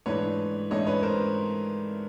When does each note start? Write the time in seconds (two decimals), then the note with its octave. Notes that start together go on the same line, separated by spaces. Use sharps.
0.06 G#2 E3 A3 D4 B4 C#5
0.71 G#2 E3 A3 D4 C#5 D#5
0.86 B4 C#5
1.03 A#4 C5